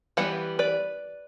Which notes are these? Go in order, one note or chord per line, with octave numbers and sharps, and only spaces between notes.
E3 G3 B3 F#5
B4 D5